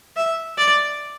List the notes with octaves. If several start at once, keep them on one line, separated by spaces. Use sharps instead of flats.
E5
D5